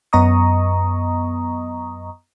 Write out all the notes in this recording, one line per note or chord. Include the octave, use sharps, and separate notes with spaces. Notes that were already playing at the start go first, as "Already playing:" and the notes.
F#2 B3 D#5 A#5 C#6 D#6